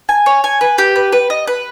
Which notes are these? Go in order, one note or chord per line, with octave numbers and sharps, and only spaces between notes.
G#5
C#5
G#5
B4
G4
B4
B4
D#5
B4